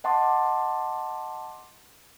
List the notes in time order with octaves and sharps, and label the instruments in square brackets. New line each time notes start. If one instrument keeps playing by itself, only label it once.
[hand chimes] D#5 F#5 A5 C6 D6